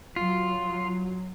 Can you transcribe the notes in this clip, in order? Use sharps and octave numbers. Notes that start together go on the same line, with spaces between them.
F#3 F4